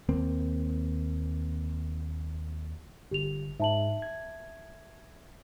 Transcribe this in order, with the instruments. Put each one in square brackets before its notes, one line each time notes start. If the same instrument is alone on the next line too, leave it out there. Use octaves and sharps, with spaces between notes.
[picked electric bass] D#2 A#3 C4
[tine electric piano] G1 [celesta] G4 F7
[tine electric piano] G#2 [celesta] E5 A5 F#7
[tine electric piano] G#6